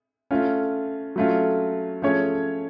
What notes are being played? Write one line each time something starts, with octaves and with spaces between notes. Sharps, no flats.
A3 C#4 F4
F#3 A3 C#4 F4
F3 A3 C#4 G#4 C#5